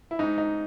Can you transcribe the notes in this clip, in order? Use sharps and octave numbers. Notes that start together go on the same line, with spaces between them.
E4
G#2 D#4
D#4